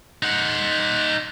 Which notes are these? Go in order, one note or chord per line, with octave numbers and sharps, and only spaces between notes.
D#4 F#5